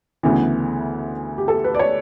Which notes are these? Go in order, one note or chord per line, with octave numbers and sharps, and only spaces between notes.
D2 C#3 E3 B3
G4
A4
B4
D5
C#5